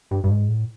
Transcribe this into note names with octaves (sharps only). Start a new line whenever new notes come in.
G2
G2
G#2
A2